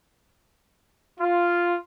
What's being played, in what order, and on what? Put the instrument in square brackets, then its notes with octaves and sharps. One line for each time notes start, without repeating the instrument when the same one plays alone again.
[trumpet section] F4